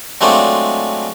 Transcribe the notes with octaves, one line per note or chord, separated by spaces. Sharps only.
F#3 G#3 A3 C4 D4 F4